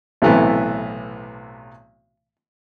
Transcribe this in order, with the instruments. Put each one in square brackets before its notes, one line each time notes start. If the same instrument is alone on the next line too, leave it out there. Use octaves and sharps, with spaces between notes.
[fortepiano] B1 A2 C3 E3 A3 B3